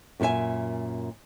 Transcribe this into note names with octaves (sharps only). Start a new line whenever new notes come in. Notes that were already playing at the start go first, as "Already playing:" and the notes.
F#2 A#2 G4 E5 G#5